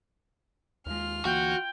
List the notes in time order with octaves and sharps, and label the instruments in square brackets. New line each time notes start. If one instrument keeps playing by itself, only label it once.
[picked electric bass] D#2 G#3 [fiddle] F4 F6
[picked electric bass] D2 E3 A#3 [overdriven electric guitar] F#4 [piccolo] G5